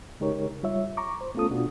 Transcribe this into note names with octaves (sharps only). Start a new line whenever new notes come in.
C#3 G#3 D#4 G4 A#4 C#5
G3 F4 C#5 E5
A#5 C#6 D6
C5
A3 B3 C#4 F4 A4 D#6
B2 B3 D4 F4 F#4